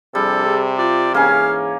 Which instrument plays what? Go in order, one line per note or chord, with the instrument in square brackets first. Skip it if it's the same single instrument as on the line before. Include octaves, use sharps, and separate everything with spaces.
[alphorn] C3 [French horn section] F3 D4 G#4 [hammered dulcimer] G3 [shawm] A4
[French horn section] G#4
[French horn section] F4 [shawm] D5
[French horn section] G#2 E3 G#4 [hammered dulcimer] A#3 C#4 G#5 [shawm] F5